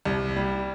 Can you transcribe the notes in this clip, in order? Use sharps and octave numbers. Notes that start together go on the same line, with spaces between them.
C2
G3